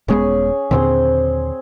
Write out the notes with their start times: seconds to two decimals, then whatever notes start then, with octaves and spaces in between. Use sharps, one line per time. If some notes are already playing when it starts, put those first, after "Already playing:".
0.08 D#1 G#3 B3 C#4 G#4
0.71 D#2 A#2 D3 C4 G#4